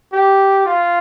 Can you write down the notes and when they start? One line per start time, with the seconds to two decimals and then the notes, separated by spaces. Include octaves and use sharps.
0.12 G4
0.66 F4